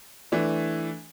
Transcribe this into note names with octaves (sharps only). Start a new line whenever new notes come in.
E3 A3 D4